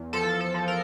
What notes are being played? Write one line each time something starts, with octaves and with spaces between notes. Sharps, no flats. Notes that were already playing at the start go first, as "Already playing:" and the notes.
Already playing: E2
F3 A4
A4
F3
A#4